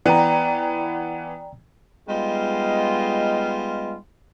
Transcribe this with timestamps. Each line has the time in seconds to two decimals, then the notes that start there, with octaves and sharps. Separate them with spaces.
0.06 E3 B3 D5 G5 A#5
2.08 G3 G#3 B3 D#4 F4